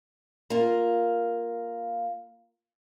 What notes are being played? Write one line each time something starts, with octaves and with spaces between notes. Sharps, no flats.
A#3 F4